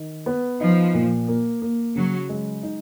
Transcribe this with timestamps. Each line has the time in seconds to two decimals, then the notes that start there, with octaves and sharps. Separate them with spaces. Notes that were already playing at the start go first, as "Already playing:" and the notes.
Already playing: D#3
0.26 B3
0.60 F3 D#4
0.94 A#2
1.28 A#3
1.62 A#3
1.95 C#3 F#3
2.29 G#3
2.63 D#4